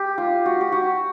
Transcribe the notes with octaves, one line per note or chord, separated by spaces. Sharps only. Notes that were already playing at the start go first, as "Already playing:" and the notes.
Already playing: G4
F4
F#4
G4
F#4